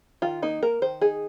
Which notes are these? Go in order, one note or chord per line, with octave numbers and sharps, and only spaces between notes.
D#3 F4
A#3 D#4
A#3 A#4
D#3 C5
D#4 G#4